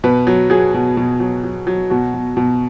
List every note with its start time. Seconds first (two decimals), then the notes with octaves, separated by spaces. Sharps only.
0.04 B2 B4
0.27 F#3
0.50 F#3 G#4
0.74 B2
0.97 B2
1.20 F#3
1.44 F#3
1.67 F#3
1.90 B2 F#4
2.14 B2
2.37 B2